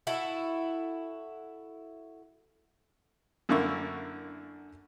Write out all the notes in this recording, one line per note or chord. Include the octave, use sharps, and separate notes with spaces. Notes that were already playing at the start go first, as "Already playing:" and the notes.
E4 F#4 A4
F#2 D3 A#3 E4 C#6